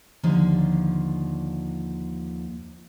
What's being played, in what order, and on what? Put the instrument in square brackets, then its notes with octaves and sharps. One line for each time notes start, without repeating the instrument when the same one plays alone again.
[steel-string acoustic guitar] D#2 D3 F3